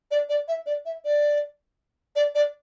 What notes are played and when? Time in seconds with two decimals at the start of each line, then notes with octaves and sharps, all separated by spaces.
0.11 D5
0.29 D5
0.48 E5
0.66 D5
0.86 E5
1.05 D5
2.16 D5
2.35 D5